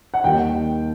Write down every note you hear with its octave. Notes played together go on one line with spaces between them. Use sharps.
F#5
D#2 D#3 G3 G5